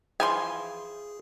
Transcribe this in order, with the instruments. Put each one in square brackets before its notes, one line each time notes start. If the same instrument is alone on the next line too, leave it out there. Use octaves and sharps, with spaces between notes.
[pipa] E3 F3 C6 [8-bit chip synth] G#4 [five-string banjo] G#5